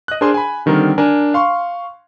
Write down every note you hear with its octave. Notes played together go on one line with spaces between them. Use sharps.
D#5 F#6
D4 G#4 A#4 C5 G#5 C6
G#5 B5
D3 D#3 G3 C4 A#4
D4 A#4 G#5
F5 C6 C#6